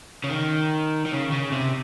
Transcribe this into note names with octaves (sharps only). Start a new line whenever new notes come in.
C#3
D#3
D#3
C#3
C#3
C3